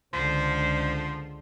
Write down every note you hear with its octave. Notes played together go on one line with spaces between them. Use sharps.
C#2 D3 F3 C5